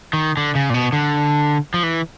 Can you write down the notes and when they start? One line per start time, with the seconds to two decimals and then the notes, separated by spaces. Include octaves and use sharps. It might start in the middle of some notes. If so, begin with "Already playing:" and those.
0.13 D#3
0.37 D3
0.55 C#3
0.70 A#2
0.74 B2
0.93 D3
1.74 F3
1.83 E3